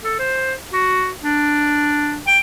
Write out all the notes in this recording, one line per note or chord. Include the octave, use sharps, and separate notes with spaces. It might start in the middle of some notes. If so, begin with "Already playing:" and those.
A4
C5
F#4
D4
G5